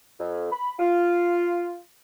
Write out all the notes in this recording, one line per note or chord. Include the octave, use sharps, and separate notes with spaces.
F2
B5
F4